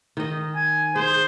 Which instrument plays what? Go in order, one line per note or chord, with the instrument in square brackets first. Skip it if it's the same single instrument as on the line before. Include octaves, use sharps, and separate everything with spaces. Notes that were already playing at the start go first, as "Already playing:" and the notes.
[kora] D#3 D#5
[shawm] G#5
[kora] G#4 [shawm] C5